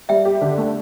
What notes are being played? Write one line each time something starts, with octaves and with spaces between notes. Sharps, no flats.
G3 E5 G5
G4
D3
A3